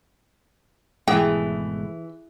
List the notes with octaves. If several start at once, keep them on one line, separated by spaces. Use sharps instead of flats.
G#1 B2 E3 A3 G#4 G5